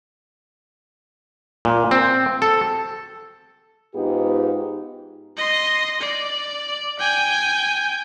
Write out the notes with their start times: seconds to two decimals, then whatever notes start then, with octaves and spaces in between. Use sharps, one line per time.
1.65 A#2
1.91 C4
2.42 A4
3.94 G#2 B3 D#4 F4 G4 G#4
5.37 D#5 C6
6.01 D5
6.99 G5 G#5